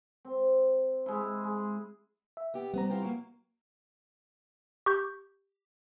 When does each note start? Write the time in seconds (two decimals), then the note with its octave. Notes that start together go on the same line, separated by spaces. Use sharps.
0.25 C4
1.06 G#3 E4
1.44 G#3
2.37 E5
2.54 B3 G4
2.74 G3 B3 C4 A#5
2.90 E4 F4 G4
3.02 F#3 A#3
4.86 G4 C#6 G6